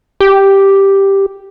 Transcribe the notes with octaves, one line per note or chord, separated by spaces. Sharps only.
G4